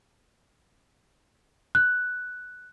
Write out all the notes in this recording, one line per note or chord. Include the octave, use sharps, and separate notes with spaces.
F#6